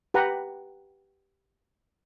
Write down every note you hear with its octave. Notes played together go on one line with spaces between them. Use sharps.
G4 B4 F#5 A#5